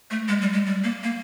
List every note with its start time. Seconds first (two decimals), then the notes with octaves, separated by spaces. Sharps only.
0.11 A3
0.28 G#3
0.41 G3
0.53 G#3
0.66 G3
0.84 A#3
1.03 A#3